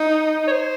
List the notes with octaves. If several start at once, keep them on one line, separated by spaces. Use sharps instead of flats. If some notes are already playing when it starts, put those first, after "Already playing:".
Already playing: D#4
C#5
C5